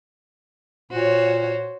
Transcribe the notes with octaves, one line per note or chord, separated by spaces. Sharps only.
A#2 F#4 C5 C#5